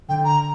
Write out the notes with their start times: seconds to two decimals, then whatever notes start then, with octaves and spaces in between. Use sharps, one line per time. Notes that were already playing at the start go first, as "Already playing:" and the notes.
0.09 D3 G5
0.25 A#5